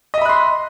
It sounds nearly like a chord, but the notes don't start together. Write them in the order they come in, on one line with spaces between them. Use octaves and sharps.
D#5 E5 B5 F#6 C6